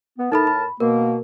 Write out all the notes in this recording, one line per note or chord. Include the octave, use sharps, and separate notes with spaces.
B3
A2 D#4 A4 A#4 A5 B5
B5
B2 A#3 A#4